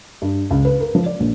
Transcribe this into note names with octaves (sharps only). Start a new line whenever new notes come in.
G2
C#2
B4
A#4
F3
D5
A#1